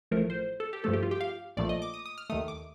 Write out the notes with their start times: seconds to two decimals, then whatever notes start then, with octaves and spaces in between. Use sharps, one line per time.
0.11 A1 A2 F3 A3 A#4
0.30 C5
0.60 A4
0.73 G4
0.84 G2 F3 A3 A4
0.93 G4
1.03 F4
1.11 G4
1.21 F5
1.57 A#1 A#2 F3 A3 D5
1.69 D#5
1.82 D6
1.94 D#6
2.06 D#6
2.18 F6
2.30 D#2 D#3 A3 D#6
2.48 D6